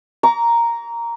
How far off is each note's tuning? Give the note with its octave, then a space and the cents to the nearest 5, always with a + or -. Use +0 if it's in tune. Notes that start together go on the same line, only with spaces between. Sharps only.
A#5 +0 D6 -45